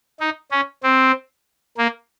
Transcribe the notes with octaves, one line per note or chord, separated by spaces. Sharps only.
D#4
C#4
C4
A#3